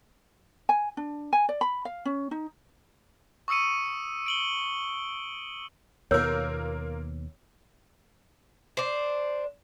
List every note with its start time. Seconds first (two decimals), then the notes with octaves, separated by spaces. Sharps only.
0.69 G#5
0.97 D4
1.33 G#5
1.49 D5
1.61 B5
1.85 F5
2.05 C#4
2.31 D#4
3.48 C#6 D#6 E6 C#7 D#7
4.26 D7 F#7 G7
6.11 D#2 B2 A#3 B3 F4 A#4 C#5 E6
8.77 D4 C5